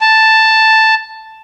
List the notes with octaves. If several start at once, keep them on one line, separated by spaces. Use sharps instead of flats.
A5